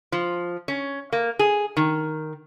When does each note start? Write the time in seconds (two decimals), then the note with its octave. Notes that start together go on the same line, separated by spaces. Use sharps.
0.12 F3
0.68 C#4
1.12 A#3
1.39 G#4
1.77 D#3